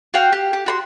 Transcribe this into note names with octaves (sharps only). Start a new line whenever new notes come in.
F#4 F5 G5
G4
G4
F#4 B5 C6